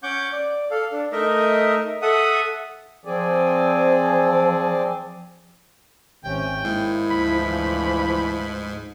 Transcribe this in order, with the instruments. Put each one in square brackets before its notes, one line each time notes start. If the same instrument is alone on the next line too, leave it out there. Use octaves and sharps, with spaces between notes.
[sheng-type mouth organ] C#4 F#5 C#6 D6 G6
D5
A4 F5
D4
A3 D#4 A#4 D#5 E5
A4 E5 F#5 D#6
[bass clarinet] F3 [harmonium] C4 G#4 D5
[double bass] G#1 C#4 [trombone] C3 [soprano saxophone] G5
[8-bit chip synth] G#2 [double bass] A#3 [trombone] E4
[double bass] D2 F3 [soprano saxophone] B5
[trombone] E3